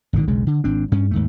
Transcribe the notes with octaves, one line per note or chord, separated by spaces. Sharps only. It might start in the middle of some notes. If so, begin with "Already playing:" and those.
G#1 A#2 D3 D#3
E1 B1 C#3 G#3
D3
G#1 C4 D4
G2 C#4
D#2 G#2 A3